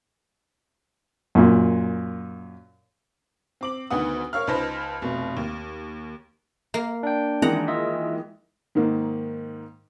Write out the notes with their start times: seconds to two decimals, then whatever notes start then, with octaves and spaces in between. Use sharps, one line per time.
1.35 F#2 A#2
3.61 C4 D6 F#7
3.91 D2 D#3 B3 F#5 D#6
4.33 A#4 C#5 F5 F6
4.47 C#2 D#4 B4 C5 A5 A#6
5.02 F1 B2
5.37 D#2
6.74 A#3
7.03 D4 G5
7.42 D#3 E3 G#3 F#5 A#5
7.68 F4 D#5 E5
8.75 G#2 D#3 A#3